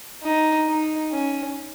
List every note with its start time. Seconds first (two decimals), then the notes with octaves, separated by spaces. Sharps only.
0.23 D#4
0.67 D#4
1.12 C#4